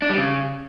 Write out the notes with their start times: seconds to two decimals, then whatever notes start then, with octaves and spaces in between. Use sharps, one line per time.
0.02 D4
0.10 G3
0.17 C#3